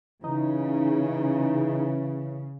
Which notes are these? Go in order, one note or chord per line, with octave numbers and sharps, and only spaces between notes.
C#3 E3 D#4